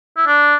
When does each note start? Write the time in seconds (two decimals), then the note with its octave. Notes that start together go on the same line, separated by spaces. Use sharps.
0.17 E4
0.27 D4